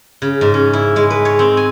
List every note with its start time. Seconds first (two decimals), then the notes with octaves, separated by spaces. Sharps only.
0.22 C#3
0.41 G#2
0.54 C#4
0.73 E4
0.96 G#3
1.10 B4
1.25 C#5
1.39 C4
1.57 G#5